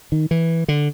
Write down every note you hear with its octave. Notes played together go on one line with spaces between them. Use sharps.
D#3
E3
D3